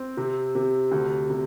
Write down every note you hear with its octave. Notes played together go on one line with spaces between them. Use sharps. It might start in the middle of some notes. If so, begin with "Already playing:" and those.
Already playing: C4
C3
C3
D2
C3